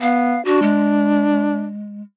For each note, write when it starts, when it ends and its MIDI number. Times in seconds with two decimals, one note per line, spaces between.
0.01 0.38 59
0.01 0.43 77
0.45 1.70 62
0.45 0.62 66
0.62 2.02 56